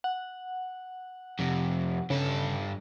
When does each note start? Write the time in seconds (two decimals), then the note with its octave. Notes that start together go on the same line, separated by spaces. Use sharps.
0.04 F#5
1.39 F2 C3
2.10 G2 C#3 A4